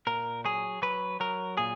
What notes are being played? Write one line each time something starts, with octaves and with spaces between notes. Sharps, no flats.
A#2 A#4
F#3 G#4
F#3 B4
F#3 A#4
A#2 G#4